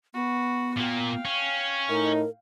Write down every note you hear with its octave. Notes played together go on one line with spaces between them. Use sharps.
B3 F#4 B4
A#2 A#3 F5 G5
C#4
A2 D#4 A#4